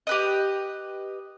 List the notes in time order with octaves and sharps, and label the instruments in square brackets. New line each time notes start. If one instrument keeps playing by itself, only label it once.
[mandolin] G4 B4 D#5